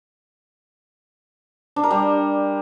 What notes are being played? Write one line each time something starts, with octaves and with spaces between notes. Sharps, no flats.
D4
A#4
G3